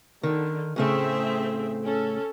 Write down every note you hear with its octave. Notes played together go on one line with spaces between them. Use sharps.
D3 D#3
A2 C#3 A3 C4 G#4 E5
C#4 A4